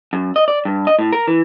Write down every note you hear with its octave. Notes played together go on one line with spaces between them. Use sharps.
F#2
D#5
D5
G2
D#5
A2
A#4
E3